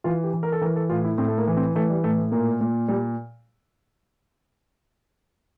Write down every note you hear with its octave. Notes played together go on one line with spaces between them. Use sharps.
E3 F4
G4
E3
A#4
A4
E3 A#4
A4
A2 F4
E4
A2 C4
A3
A#3
E3
C4
E3 A3
G3
A2 A3
A3
A#2 A#3
A#2
A#2 G3